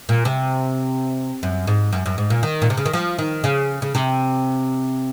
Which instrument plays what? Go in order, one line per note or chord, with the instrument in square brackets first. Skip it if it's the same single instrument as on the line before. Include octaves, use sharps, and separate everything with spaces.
[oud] A#2
C3
F#2
G#2
F#2
F#2
G#2
A#2
D#3
A#2
C3
C#3
D#3
F3
D#3
C#3
C#3
C3